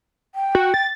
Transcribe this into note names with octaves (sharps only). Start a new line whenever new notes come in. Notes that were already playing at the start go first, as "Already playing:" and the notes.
G5
F#4
A6